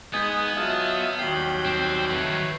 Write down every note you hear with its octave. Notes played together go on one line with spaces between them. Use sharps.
G#3 B3 D#4 D#5 G6 G#6
F#3 F4 D#5 E5 A5
D#2 F#3 G3 G5 C7 F#7
C4 C7
D#3 F#3 A3 B4 C#5